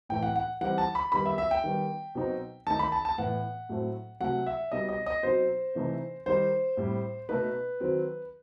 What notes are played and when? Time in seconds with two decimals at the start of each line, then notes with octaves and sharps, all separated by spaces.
0.09 A2 E3 A3 G5
0.23 F#5
0.36 F#5
0.61 E3 G3 C4 D#4 F#5
0.78 A5
0.95 B5
1.12 D#3 G3 B3 D#4 B5
1.25 E5
1.38 E5
1.51 G5
1.64 D#3 G3 B3
2.15 B2 F#3 C4 D#4
2.67 D#3 A3 D#4 A5
2.79 B5
2.92 A5
3.05 A5
3.18 A2 E3 B3 F#5
3.69 A2 F#3 A3 C4
4.21 C3 F#3 A3 F#5
4.46 E5
4.72 B2 G3 D#4 D#5
4.89 D#5
5.06 D#5
5.23 B2 F#3 C4 D#4 C5
5.75 C3 E3 A3 C4 D#4
6.26 D#3 G3 D#4 C5
6.77 A2 G3 C4
7.29 B2 A3 D#4 B4
7.80 D#3 F#3 C4